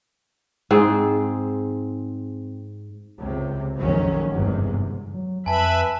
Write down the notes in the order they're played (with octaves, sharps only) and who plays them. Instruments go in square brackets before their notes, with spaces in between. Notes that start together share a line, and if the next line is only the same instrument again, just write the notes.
[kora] G#2 C4 G#4
[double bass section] C#2 C3
A#1 F2 D#3 F#3 G#3 C#4
G1 E2 G#2 C3
[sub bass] F#3
[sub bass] F2 [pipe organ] B4 E5 B5 [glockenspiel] G#5 A5